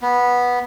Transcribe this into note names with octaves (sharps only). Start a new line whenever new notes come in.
B3